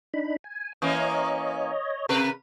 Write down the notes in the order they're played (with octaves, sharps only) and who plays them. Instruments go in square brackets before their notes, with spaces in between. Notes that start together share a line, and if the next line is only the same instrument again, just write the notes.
[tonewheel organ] D4 D#4 B5
G#5
[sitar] E3 A#3 C#4 [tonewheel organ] C#5 D#5
[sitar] C3 A#4 B4